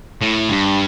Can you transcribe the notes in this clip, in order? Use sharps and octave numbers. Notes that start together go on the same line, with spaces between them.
A2
G2